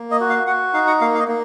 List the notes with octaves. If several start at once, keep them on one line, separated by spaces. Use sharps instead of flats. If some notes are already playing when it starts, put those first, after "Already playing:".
Already playing: A#3
D#5
F#4
F5
F#4 F#5
D#4 F5
F#5
A#3 F5
F5
D#5
A#3